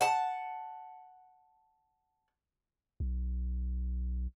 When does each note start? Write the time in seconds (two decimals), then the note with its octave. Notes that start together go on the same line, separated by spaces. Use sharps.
0.01 F#5 A5
3.00 B1